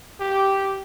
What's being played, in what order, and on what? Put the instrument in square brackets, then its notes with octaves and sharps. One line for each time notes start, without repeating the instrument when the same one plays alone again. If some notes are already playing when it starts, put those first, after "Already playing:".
[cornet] G4